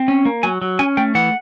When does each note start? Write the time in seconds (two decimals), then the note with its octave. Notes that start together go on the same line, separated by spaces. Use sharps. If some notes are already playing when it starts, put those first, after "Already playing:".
Already playing: C4
0.08 C#4
0.25 A#3
0.43 F#3 G#5
0.62 F#3
0.79 C#4 G#5
0.97 A3 G5
1.15 E3 F#5